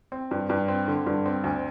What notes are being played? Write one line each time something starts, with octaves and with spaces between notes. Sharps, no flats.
C4
G2
G2
C4
D3
G2
C4
D2